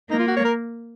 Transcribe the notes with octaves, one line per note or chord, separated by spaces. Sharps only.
A#3 D#4
F4
F#4
C#5
A#4